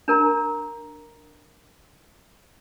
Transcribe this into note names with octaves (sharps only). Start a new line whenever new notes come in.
D4 A#4 A#5